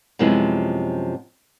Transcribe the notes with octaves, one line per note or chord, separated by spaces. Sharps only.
F#2 C3 F3 G#3 B3 E4